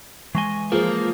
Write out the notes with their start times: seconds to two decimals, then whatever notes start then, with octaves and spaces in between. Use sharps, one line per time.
0.35 E3 G#3 G#5 C#6 A#6 G7
0.72 F3 A#3 G#4 B4 C5